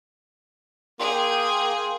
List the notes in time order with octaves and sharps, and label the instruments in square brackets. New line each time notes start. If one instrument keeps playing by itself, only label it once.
[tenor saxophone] A#3 [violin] G#4 [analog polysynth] G5 [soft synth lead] C6